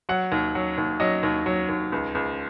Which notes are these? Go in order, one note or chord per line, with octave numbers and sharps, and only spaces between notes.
F#3 F#5
D#2
F#3
D#2
F#3 D#5
D#2
F#3
D#2
C#2
C#2